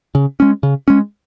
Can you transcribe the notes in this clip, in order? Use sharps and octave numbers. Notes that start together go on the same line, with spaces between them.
C#3
G#3 C#4
C#3
G#3 C#4